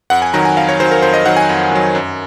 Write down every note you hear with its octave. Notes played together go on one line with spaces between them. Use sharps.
F2 F#5
G#5
D#3 F#3 A#5
G#5
F2 F5
C#5
D#3 F#3 C5
A#4
F2 C5
D#5
D#3 F#3 F#5
G#5
F2
D#3 F#3
F#2